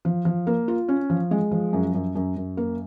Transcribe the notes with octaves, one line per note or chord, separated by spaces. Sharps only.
F3
F3
A#3
F4
C#4
F3
G#3
F3
F#2
F#2
F#2
F#2
A#3